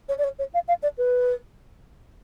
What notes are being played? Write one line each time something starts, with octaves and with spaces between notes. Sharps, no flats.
C#5
D5
C#5
C#5
F5
F5
D5
B4